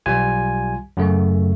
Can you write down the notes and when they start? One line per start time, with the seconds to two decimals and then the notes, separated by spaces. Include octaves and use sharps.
0.06 B1 G3 F4 G#5
0.97 F#2 C#3 A3